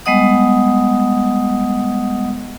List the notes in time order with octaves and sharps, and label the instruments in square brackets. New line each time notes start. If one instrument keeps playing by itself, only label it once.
[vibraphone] G3 G#3 B3 D#5 F#5 D#6